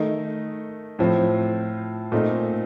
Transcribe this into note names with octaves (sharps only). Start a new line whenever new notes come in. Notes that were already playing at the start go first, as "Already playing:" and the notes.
Already playing: D#3 A3 D#4
A2 F3 C4
A#2 A3 C4 D#4